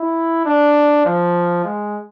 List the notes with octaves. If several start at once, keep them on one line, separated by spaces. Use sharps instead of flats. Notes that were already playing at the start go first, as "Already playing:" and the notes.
Already playing: E4
D4
F3
G#3